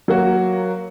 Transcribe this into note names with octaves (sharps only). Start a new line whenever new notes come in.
F#3 A#3 F#4